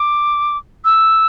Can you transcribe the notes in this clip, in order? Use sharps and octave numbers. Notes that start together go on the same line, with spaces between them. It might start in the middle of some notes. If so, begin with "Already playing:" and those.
Already playing: D6
E6